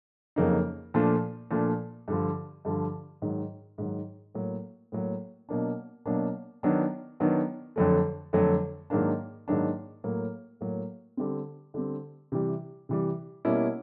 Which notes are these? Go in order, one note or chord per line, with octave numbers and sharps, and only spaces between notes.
F2 C#3 F#3 A#3 D#4
A#2 F3 A3 D4
A#2 F3 A3 D4
G2 D3 F3
G2 D3 F3
G#2 D#3 F#3
G#2 D#3 F#3
A2 F#3 A#3
A2 F#3 A#3
B2 F#3 A#3 D4
B2 F#3 A#3 D4
D#3 F#3 B3 D4
D#3 F#3 B3 D4
F2 D3 F#3 A3
F2 D3 F#3 A3
G#2 D#3 F#3 A#3 D4
G#2 D#3 F#3 A#3 D4
A2 F#3 A#3
A2 F#3 A#3
D3 G3 C4
D3 G3 C4
C3 E3 G3
C3 E3 G3
B2 G3 A#3 C#4 E4